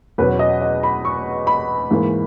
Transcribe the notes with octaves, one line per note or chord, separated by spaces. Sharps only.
E2 B2 F#3 C#4 B4
D#5
D#5
B5
C#6
B5
G#2 E3 A#3